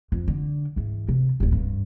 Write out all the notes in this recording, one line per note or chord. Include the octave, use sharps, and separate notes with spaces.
F2
D3
G#2 E3
C3
D1 B3
G2